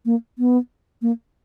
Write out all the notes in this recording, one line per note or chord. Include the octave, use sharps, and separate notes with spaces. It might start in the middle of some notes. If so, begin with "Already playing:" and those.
A#3
B3
A#3